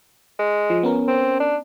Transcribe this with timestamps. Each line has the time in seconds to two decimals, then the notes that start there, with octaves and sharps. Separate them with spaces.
0.39 G#3
0.70 F3
0.83 B3 C#4 A#4
1.08 C4
1.40 D4